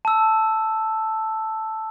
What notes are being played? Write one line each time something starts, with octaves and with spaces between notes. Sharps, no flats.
A5 E6